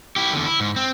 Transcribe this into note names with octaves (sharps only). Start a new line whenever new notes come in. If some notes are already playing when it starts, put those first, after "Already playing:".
E4 G4
E2 D3
E4
G#2
C4